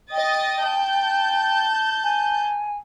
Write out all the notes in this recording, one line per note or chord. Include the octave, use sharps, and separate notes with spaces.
D#5 G5 D#6 A6
A5 G6
G#5